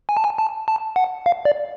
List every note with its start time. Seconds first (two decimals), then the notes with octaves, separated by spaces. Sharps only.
0.09 G#5
0.17 A5
0.24 G#5
0.38 A5
0.68 A5
0.96 F#5
1.26 F5
1.45 D5